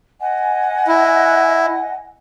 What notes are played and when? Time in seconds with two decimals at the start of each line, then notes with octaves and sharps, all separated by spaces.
0.20 D#5 F#5 G#5
0.88 E4